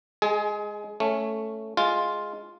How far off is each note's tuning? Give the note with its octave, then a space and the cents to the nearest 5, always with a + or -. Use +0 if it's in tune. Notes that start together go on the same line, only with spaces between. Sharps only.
G#3 +0 G#4 +30
A3 +0 C#4 +0
G#3 +0 F4 +0